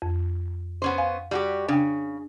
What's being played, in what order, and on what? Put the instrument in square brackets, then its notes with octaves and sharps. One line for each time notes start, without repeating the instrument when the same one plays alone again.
[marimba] F2
[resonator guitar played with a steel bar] B3 C#4 C5
[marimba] F5 G#5
[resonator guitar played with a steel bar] G3 F#4 G4
[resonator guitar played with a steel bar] C#3 [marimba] D4 G5